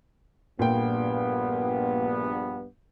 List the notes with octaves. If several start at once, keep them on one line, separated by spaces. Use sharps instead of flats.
A#1 G2 A#2 B3 G5